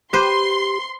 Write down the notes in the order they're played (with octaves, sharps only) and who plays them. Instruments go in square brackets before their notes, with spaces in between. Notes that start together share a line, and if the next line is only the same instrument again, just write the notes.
[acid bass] G4 [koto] B4 C5 [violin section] C6